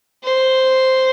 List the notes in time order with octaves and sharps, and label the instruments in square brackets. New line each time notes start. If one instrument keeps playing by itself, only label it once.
[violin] C5